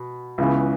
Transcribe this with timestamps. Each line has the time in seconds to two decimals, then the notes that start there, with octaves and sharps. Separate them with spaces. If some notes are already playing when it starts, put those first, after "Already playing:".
Already playing: B2
0.38 C#2 C#3 E3 B3